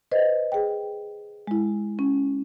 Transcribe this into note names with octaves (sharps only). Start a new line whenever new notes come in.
B4 C5 D#5
G#4 G5
G#3 E4
C#4